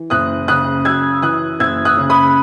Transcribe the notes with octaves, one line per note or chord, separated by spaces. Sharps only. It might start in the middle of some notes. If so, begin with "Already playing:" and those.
Already playing: E3
F#1 D#6 F#6
C#3 D#6 F#6
F#2 E6 G#6
E3 D#6 F#6
F#1 E6 G#6
D#6 F#6
C#3
B5 D#6